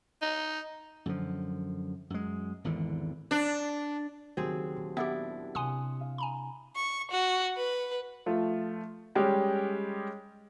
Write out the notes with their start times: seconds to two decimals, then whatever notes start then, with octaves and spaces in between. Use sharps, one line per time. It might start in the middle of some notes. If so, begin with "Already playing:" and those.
0.22 D#4
1.06 F#2 D3 F3
2.10 F#2 G#3
2.64 G#1 E2 D3 E3
3.31 D4
4.37 D#2 C#3 F#3 C4 G#4
4.77 A#2
4.97 B3 D4 E4 G4
5.55 C3 F#5 G#5 C6 D#6
6.01 F5
6.18 G#5 A#5 B5
6.76 C#6
7.11 F#4
7.57 B4
8.26 F3 A3 F4
9.15 G3 G#3 C#4 G4